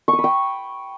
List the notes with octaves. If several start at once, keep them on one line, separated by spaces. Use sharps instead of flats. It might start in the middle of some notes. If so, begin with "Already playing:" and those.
C#6
D#6
B5
G5